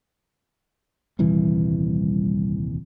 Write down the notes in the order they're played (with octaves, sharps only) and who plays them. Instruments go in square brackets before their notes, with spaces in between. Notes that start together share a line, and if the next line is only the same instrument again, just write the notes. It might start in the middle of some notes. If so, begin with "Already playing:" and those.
[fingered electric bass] D#1 C2 E3